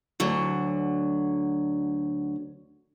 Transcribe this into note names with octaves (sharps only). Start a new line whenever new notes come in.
D2 D3 F#3